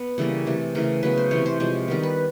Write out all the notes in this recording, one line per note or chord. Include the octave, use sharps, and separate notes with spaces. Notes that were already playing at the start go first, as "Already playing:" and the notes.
Already playing: B3
C#3 E3 G3 A#3 A4
C3 E3 A3
C#3 E3 A3 A#4
C#3 F#3 B3 B4
C5
C3 E3 A3 C#5
C5
C3 F3 G#3 C#5
D#3 G3 B3 A#4
B4